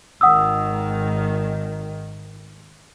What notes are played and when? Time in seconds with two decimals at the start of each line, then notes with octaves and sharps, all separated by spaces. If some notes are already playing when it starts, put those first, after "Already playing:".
0.21 G#1 D#3 F#5 D#6 E6